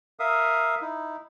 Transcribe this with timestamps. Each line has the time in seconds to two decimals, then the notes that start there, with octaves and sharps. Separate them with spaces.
0.19 A#4 E5 F5 D#6
0.81 D#4 E4